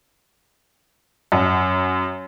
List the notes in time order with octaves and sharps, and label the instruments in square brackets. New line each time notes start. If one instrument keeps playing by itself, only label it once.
[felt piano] F#2